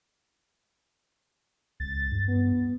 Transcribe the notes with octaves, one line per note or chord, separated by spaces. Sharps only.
C#2 A6
G2
B3